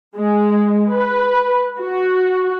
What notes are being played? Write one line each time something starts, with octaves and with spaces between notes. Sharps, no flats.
G#3
B4
F#4